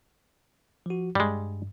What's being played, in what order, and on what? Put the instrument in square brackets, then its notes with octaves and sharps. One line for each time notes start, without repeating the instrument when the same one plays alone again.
[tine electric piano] F3 F#4
[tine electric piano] G2 [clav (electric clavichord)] G3 G#3